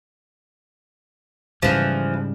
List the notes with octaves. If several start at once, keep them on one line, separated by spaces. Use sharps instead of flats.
G#2 C#3 E3 F3 G3